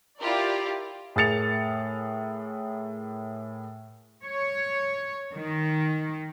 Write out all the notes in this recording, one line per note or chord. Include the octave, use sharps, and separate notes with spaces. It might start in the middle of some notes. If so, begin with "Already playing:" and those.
E4 F4 G4 A#4 D5
A2 G#4 A#4 A6 C#7 F7
C#5
D#3